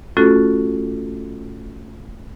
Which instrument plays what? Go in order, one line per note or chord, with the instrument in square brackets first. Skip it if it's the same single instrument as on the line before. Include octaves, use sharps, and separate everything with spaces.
[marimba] A3 C#4 F4 F#4 A4